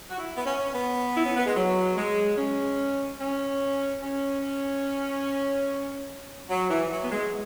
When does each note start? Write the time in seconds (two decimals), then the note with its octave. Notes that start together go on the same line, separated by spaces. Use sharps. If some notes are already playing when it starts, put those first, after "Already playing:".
0.10 F#4
0.18 E4
0.36 B3
0.45 C#4
0.73 B3
1.17 E4
1.26 C#4
1.36 B3
1.46 G#3
1.56 F#3
1.97 G#3
2.37 C#4
3.20 C#4
4.03 C#4
6.50 F#3
6.70 E3
6.91 F#3
7.04 B3
7.11 G#3